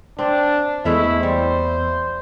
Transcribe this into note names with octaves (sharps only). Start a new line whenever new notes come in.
C4 D4
E2 G#3 A3 E4 E5
G3 C5